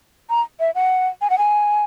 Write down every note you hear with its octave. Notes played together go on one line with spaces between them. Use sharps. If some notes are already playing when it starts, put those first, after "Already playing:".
A#5
E5
F#5
G#5
F#5
G#5